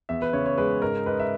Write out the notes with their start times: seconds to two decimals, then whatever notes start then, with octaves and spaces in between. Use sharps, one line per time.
0.09 E2 E5
0.22 B4
0.33 C#3 C#5
0.46 C#5
0.58 G#3 B4
0.82 G#2 A#4
1.06 G#2 B4
1.19 E5